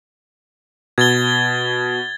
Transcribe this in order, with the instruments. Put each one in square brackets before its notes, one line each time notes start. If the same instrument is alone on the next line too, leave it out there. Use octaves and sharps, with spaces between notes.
[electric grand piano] B2 [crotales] G#6 A6 G7